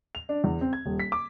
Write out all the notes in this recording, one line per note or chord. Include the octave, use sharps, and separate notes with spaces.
F7
D4
E2
C4
G#6
D#1
B6
D6